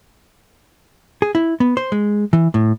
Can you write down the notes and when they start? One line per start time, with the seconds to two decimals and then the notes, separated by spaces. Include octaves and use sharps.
1.22 G#4
1.35 E4
1.60 B3
1.77 C5
1.92 G#3
2.33 E3
2.54 A2